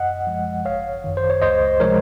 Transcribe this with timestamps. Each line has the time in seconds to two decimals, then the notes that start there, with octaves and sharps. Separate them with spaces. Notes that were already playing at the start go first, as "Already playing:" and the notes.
Already playing: F#2 D#5 F#5
0.27 F3 G#3
0.65 G#1 C#5 F5
1.04 F#2 D#3
1.17 C5
1.30 C#5
1.42 C#2 C5 D#5
1.80 C3 F3 G#3 A#4 C#5